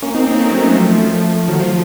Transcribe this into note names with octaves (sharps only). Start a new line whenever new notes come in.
A#3 C#4
C4 D#4
A#3 C#4
A3 C4
F#3 A#3
A3 C4
F3 A3
D#3 F#3
F3